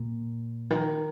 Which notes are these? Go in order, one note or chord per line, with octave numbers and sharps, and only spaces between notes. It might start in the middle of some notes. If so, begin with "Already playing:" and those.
Already playing: A#2
D#3